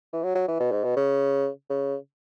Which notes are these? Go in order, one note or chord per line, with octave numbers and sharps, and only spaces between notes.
E3
F#3
F#3
E3
B2
G#2
B2
C#3
C#3